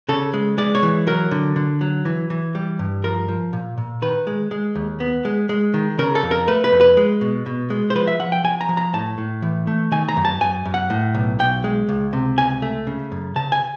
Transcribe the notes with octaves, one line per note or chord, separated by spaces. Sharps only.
C#3 A4
G#3
G#3 D5
C#5
E3
F#3 A#4
D3
D3
F#3
E3
E3
G3
G2
F3 A#4
F3
A#2
A#2
D#3 B4
G#3
G#3
D#2
B3
G#3
G#3
D#3
C#3 A#4
A4
F2
A#4
A3 B4
B4
F2
B4
G#3
B2
B2
G#3
C5
F3 B4
E5
F3 F#5
G5
F3 G#5
A#5
F3
A#5
A2 A5
A2
E3
A3
D#3 G#5
A#5
F#2
A5
F#2 G#5
F#2
F#5
A2
B1
B1 G5
G#3
C#2
C3
C#2 G#5
A3
C#3
F#2
C#3 A5
G#5